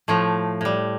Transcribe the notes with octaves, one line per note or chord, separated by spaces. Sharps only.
A2 F3 A3
A2 G3